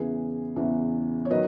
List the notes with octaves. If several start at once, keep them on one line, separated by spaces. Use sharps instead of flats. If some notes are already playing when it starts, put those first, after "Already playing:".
Already playing: E2 C#3 E3 G#4 B4
E2 C#3 E3
C#5
D#3 F#3 B4 D#5